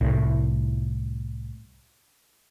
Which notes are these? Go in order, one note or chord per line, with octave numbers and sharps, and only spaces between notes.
C2 A2